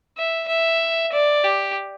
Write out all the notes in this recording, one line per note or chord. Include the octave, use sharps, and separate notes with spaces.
E5
E5
D5
G4